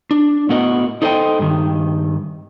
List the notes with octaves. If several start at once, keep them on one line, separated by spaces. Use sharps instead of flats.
D4
A2 B3 F#4 A#4 D#5
D#4 A4 C5 C#5 D#5 G5
G2 D#3